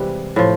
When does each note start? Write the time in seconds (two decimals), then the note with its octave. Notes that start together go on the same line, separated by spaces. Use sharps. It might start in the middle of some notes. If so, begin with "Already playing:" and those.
Already playing: C3 E3 G3 G#3
0.36 A2 F3